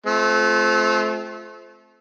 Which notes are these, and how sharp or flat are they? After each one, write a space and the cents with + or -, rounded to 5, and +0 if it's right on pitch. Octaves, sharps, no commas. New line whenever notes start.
A3 -30 C4 +0 F4 +0